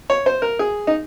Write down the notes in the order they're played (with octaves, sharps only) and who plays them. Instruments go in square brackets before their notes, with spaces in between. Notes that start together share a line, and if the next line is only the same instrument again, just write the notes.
[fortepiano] C#5
C5
A#4
G#4
D#4